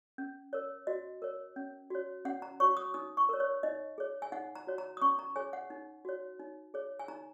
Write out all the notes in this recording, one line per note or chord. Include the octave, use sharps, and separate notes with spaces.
C#4
A#4 C#5
F#4 D#5
A#4 C#5
C#4
F#4 C#5
C#4 F#5
A#5
F#4 C#5 C#6
D#6
D#4 D#6
C#6
A#4 C#5
C#5
D#4 D#5
G#4 C#5
G#5
D#4 F#5
A#5
F#4 C#5
A#5
D#6
C#4 C#6
A#5
G#4 C#5 G#5
F#5
D#4
F#4 C#5
D#4
G#4 C#5
G#5
D#4 A#5